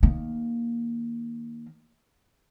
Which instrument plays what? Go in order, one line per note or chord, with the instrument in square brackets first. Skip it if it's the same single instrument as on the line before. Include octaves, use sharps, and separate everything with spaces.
[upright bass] D#3 A#3